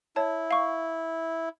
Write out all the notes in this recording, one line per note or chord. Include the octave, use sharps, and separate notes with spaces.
E4 C#5 A5
F5 C#6